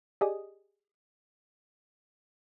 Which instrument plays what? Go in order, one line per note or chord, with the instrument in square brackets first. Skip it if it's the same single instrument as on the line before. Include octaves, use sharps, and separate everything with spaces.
[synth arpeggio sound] G4 G#4 D5 D#5 G#5 D#6